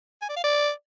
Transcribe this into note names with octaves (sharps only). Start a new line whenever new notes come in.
G#5
D5
F5
D5